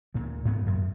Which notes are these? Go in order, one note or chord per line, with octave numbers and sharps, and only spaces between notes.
D2 A#2
G#2 B3
F#2